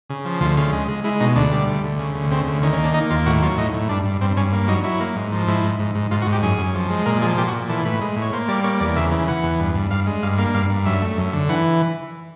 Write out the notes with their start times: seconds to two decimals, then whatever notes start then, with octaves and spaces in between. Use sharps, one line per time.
0.10 C#3
0.25 F3
0.41 D2 F4
0.57 C#3 F4
0.73 G#3
0.88 G#3
1.04 G#3 E4
1.20 B2 D#4
1.36 D2 D4
1.52 G3
1.68 D2
1.84 D2
1.99 C#3
2.15 D2
2.31 C#3 C4
2.47 D2
2.63 D#3 C#4
2.73 C#4
2.78 A#3
2.84 D4
2.94 A#3 D#4
3.10 D#2 F4
3.26 A2 F#4
3.42 F#3 F4
3.58 A2 D#4
3.74 A2
3.89 G2 D4
4.05 G2
4.21 G2 C4
4.37 G2 C#4
4.53 A#3
4.68 F#3 D#4
4.84 F#3 E4
5.00 A#3
5.16 G#2
5.32 F3
5.48 G#2 E4
5.64 G#2
5.79 G#2
5.95 G#2
6.11 G#2 F4
6.22 F#4
6.27 G#2
6.32 G4
6.43 F#2 G#4
6.58 F#2
6.74 F3
6.90 G#3
7.06 A#2 A#4
7.22 F3 G#4
7.38 A#2 G4
7.48 F#4
7.53 A#2
7.69 E3 A4
7.85 A2 B4
8.01 G#3
8.17 A2
8.22 C#5
8.33 A#3 C5
8.48 G3 D5
8.64 A#3 C#5
8.80 E2 D5
8.96 C#3 E5
9.12 E3
9.28 E3 F#5
9.43 E2
9.59 G2
9.75 G2
9.91 G2 F5
10.07 G#3
10.23 G2 F5
10.38 A#3 F5
10.54 G2 F5
10.70 G2
10.86 F#2 E5
11.02 A3
11.18 F#2
11.33 D3
11.49 E3 F#5